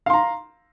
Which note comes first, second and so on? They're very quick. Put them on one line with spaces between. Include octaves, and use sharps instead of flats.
F5 C6 A#5